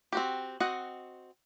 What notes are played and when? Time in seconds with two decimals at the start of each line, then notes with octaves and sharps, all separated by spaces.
0.13 C4 F#4 G4
0.60 C4 F#4 D#5 F#5